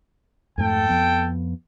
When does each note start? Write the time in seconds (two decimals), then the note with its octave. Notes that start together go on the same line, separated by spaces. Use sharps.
0.58 F2 G#2 A3 A4 G5
0.89 F2 F3 B3